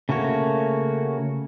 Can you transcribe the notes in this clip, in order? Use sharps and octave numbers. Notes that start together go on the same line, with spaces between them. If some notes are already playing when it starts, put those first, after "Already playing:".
C#3 A3 A#3 F#4 C#5